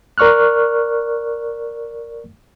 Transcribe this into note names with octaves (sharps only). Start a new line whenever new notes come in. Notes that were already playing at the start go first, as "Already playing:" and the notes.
A#4 D5 C#6 F6 F#6